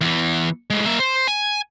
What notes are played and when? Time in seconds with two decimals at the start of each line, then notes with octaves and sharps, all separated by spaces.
0.01 E2 E3
0.70 A2 G#3
0.86 A#3 E5
0.99 C5
1.28 G#5